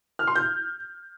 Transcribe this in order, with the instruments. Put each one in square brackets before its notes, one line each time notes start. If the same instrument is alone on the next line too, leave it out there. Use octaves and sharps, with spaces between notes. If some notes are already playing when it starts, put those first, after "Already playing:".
[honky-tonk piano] F6
C6
G6